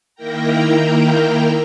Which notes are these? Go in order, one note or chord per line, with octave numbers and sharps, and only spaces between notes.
D#3 A#3 E4 A#4 G5 A#5